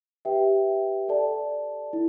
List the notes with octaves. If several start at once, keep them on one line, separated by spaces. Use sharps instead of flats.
G4 B4 E5 G5
A4 D5 A5
E4